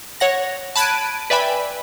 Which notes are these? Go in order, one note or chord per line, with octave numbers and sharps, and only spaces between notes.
C#5 F#5 A#6
A5 B5 F#6 G#6 D7 D#7
B4 D5 E5 G5 G#5 B5